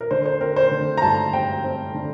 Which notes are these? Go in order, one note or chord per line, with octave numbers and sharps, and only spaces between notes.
A#4
D3 C5
C5
C4 A#4
C5
D3
A#5
G2 A5
C4 G5
C4
D3